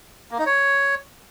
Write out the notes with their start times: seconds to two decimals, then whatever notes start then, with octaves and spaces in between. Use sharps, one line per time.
0.31 A#3
0.38 D#4
0.46 C#5